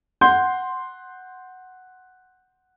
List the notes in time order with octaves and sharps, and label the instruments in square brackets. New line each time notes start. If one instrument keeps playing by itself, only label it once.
[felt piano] F#5 C6 G6